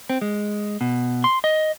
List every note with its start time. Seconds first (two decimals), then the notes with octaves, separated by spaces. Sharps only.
0.10 C4
0.22 G#3
0.81 B2
1.24 C6
1.44 D#5